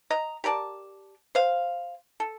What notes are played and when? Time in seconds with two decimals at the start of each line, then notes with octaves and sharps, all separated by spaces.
0.10 D#5 A#5
0.44 G4 A#4 D5 A5
1.35 C5 F5
2.20 A4